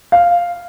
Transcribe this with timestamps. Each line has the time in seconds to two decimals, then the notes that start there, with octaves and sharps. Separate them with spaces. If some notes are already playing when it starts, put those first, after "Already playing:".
0.12 F5